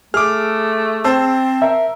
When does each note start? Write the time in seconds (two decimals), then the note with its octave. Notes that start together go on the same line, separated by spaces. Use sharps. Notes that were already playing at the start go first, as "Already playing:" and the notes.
0.14 A3 G#4 D6 F6
1.04 C4 C5 A5 E6
1.62 A#4 E5